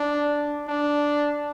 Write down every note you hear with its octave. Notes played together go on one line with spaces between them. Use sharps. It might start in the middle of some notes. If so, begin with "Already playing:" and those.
Already playing: D4
D4